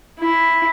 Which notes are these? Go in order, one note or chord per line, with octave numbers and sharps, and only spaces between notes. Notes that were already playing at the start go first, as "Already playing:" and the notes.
E4